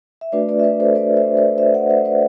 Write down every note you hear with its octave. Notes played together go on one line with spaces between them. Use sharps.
E5
A3 D4 F#4 B4 D5
B4 D5
E5
B4 D5
A4 C5
B4 D5
C5 E5
B4 D5
C5 E5
D5 F#5
C5 E5
B4 D5